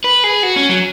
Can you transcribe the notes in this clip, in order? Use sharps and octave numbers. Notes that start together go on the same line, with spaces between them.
B4
G#4
F#4
C#4
F#3